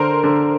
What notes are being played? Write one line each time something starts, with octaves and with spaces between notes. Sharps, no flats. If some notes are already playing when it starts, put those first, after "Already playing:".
Already playing: D3 A#4 C5
D3